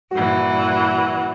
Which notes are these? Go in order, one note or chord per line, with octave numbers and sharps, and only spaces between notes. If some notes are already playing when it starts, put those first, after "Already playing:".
G2 A#2 E3 F#4